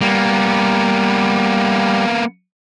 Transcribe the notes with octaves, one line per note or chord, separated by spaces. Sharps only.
G3 A#3 B3